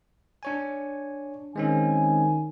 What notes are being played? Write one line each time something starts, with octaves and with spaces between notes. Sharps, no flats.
D4 C#5 G#5
D#3 G#3 C4 C#4 G#5